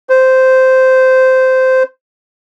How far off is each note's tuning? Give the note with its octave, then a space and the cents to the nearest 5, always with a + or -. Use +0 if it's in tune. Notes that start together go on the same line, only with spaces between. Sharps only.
C5 -10